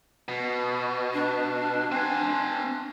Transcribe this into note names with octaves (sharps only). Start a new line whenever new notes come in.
B2
D4
C4 G#5